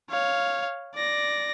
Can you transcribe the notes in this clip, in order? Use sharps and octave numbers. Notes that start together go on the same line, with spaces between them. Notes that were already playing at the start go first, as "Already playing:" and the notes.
C#5 F5
D5 A#6